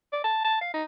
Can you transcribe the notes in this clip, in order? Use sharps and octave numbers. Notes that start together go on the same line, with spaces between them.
D5
A5
A5
F5
D#4